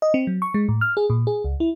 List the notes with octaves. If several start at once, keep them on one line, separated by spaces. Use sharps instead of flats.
D#5
C4
F#3
C#6
G#3
A2
F6
G#4
A#2
G#4
C#2
E4